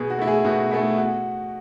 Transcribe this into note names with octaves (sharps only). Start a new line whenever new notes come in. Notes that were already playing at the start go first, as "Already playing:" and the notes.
Already playing: B2 G#4
F#4
A3 E4
G#4
B2 F#4
A3 E4 G#4
F#4